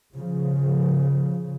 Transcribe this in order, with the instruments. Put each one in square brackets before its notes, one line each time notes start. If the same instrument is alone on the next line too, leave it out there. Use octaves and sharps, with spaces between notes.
[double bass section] C#3 F3